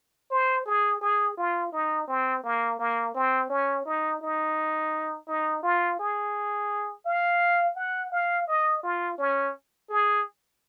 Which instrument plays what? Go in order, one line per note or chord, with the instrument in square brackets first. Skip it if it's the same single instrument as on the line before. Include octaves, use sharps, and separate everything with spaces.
[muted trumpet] C5
G#4
G#4
F4
D#4
C4
A#3
A#3
C4
C#4
D#4
D#4
D#4
F4
G#4
F5
F#5
F5
D#5
F4
C#4
G#4